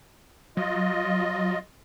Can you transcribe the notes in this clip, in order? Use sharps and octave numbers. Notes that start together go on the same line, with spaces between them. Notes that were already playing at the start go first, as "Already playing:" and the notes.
F#3 F4 D#5